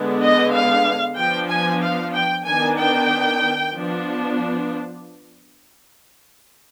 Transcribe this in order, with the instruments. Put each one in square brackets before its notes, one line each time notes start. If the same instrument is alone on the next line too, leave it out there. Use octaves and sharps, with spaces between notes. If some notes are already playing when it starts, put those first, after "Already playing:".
Already playing: [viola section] D3 G#3 B3 D4
D#5
F5
F3 B3 D4 G5
G#5
F5
G5
D#3 B3 D4 G#5
G5
F3 B3 D4